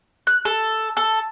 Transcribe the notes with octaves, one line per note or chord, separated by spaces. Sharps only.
F#6
A4
A4